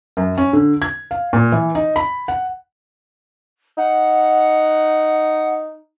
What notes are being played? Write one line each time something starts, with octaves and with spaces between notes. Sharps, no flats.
F#2
C#4
D3
G#6
F5
A#2
E3
D#4
B5
F#5
D#4 F#5